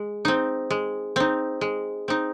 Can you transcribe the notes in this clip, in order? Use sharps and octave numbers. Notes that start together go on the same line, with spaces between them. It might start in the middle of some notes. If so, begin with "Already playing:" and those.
Already playing: G#3
C4 D#4
G#3
C4 D#4
G#3
C4 D#4